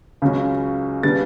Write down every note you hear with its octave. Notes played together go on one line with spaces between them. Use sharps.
C#2 C#3 F#3 C#4
C#3 G3 B3 D4 A6